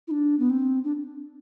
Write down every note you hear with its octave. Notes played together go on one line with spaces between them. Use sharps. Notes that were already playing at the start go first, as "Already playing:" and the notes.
E4
D4
B3
C4
D4